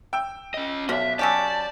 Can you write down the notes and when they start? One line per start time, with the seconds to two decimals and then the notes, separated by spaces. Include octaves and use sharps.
0.13 G5 E6
0.54 C#4 D#5
0.89 B1 F3 D#5 E5
1.19 F#3 C#4 G4 D5 A5